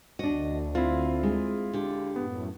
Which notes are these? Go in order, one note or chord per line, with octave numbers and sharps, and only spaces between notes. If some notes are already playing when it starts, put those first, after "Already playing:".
D2 D4 F#4 D#5
C4 E4 F4
G#3
D3 G4
F#2 A2 B3